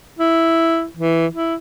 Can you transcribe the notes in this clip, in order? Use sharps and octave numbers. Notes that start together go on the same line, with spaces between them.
E4
E3
E4